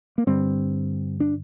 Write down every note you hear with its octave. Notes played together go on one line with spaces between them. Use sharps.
A#3
G2 D3 G3 C4
D4